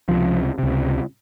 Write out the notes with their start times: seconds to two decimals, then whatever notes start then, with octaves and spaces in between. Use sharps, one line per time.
0.09 C#2 C3 F3
0.59 C#2 C3